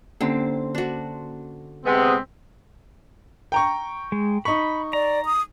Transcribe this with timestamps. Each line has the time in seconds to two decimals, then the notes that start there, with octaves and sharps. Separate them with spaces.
0.21 D3 A#3 C4 C#4 C6
0.75 D4 F#4
1.85 C3 G#3 B3 C4 E6 B6
3.52 G5 A#5 C#6
4.12 G#3
4.45 D#4 B5 C#6
4.93 D5 A#5
5.25 D#6